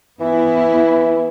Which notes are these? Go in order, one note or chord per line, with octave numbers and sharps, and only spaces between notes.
E3 B3 E4